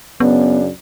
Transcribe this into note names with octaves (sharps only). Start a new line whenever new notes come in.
F#2 C#3 B3 D4